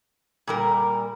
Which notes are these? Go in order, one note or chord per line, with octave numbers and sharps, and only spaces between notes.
A#2 G3 A#4